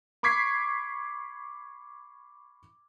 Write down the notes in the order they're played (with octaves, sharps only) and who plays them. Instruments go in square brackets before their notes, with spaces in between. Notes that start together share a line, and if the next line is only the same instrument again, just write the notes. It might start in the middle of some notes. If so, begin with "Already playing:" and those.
[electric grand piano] B5 C#6 D6 G#6 B6 C7